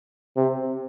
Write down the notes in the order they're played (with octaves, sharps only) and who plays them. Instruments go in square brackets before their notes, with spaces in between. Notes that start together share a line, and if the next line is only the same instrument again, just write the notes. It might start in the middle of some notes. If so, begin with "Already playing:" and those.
[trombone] C3